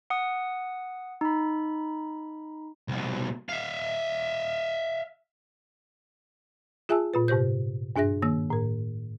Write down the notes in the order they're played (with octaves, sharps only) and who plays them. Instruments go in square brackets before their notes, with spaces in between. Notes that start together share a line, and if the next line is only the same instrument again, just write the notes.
[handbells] F#5 D#6
D#4 B5
[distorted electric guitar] C2 B2
E5 F5
[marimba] F4 G#4 E5 G#5 A5 E6
A#2 F4 B4
G#2 C3 G4 C5 G6
G2 D4 G#4 E5 A#6
D#3 A#3 E6
A2 A#4